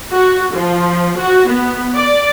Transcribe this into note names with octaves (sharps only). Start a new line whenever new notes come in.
F#4
F3
F#4
B3
D5